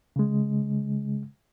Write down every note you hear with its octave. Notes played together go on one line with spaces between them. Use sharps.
C#3 G#3